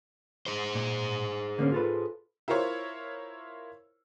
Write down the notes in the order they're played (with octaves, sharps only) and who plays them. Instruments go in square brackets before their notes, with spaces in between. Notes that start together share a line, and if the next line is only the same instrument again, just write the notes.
[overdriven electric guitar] G#4 C5
[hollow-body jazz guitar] A#2
D3 A#3 C#4
F4 A4 B4
[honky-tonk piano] E4 F4 A#4 C5 C#5